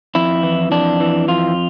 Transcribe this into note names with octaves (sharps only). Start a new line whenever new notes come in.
F2 E4
E3
F2 D4
E3
F2 F4